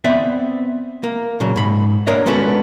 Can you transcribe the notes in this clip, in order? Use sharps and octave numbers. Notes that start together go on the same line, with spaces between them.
B3 C4 D5 E5
A#3
A#2 C#3 F#3
G#2 B5
A#3 D4 A#4 C#5 D#5
G#3 B3 C#4 D4 F#4 A4